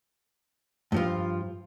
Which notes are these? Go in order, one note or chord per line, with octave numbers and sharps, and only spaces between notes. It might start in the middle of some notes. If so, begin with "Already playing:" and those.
G2 F3 F4